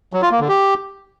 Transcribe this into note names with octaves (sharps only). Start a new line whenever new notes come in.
F#3
F4
A#3
D3
G4